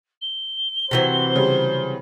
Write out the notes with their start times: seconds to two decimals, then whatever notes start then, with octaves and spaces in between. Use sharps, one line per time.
0.22 G7
0.91 C3 E3 F#3 C5
1.36 C#3 G3